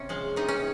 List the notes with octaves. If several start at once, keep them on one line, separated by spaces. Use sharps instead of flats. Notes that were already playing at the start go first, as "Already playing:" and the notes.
Already playing: C3 C#4
F3 G#3
C3 D#4
C#4